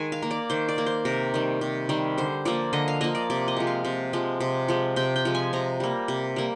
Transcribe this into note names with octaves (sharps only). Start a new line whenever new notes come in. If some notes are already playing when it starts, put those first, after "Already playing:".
Already playing: D#3 G#3 G#5
F5
A#3
D5
D#3 C5
D5
A#3
C5
C3 A#4
D#3 G3
C3
D#3 G3
D3 C5
F3 A#3 D5
D3 D#5
F5
F3 A#3 D#5
D5
C3 D5
D#5
F3 G#3
F5
C3
F3 G#3
C3
F3 G#3
C3 G5
G5
F3 G#3
G#5
C3 A#5
G3 A#3
C3
G3 A#3